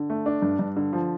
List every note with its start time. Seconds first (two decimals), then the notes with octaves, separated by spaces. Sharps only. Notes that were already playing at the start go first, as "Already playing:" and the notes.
Already playing: D3
0.10 A3
0.26 D4
0.42 G2
0.59 G2
0.76 D3
0.93 F3